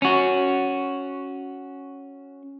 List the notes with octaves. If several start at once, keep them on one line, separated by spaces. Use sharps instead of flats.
C#4 F#4